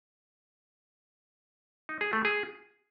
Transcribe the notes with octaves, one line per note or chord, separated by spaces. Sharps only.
D#4
G#4
A3
G#4